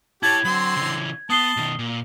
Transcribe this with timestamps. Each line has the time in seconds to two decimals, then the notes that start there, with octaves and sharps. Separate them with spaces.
0.23 E4 G4 C#5 A5 G#6
0.45 D3 F#3 C4 C6
0.77 C#3 E3
1.30 B3 A5 D#6 C7 G7
1.57 B2 D#3
1.79 A#2